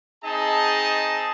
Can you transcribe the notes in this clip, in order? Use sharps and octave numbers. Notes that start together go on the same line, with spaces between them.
C4 D#4 G#4 D#5 A5